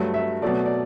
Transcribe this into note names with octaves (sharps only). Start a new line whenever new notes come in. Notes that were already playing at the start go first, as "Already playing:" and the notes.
Already playing: G2 F#3 A3
E5
B2 F#3 A3 D5
D5